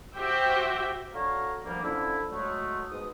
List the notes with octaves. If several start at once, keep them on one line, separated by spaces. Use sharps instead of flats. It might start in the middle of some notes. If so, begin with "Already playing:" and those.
F#4 G4 C5 E5 G5
D4 F#4 A4 C#5 F5 A#5
D2 D3 F3 G3 A#3
D3 F3 C#4 E4
F#3 G#3 A3
G#2 B2 G#3 D#6